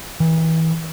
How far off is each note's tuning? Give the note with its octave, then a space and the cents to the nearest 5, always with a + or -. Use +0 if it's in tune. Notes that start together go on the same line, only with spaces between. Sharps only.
E3 -30